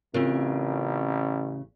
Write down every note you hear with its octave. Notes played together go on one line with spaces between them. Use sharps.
A1 C#3 C4 F4 A#4